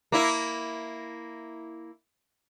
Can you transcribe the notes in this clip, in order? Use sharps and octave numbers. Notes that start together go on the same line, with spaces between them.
A#3 E4